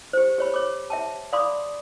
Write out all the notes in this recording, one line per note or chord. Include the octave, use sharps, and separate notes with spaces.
G4 C5
G4 C#5 B5
C#5 D6
E5 G5 A5
D5 F5 B5 C6 D6 D#6